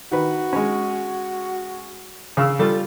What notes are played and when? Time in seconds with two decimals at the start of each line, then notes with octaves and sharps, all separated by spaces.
0.12 D#3 F#4 B4
0.53 G#3 C#4
2.37 C#3 F5 E6
2.59 G3 F4 A4